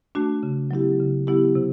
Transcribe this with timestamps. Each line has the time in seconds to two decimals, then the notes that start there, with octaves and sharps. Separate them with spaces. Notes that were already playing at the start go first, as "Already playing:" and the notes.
0.15 A3 D4 F#4
0.43 C#3
0.71 F#3 B3 E4 G4
1.00 C#3
1.27 F#3 B3 E4 G4
1.55 C3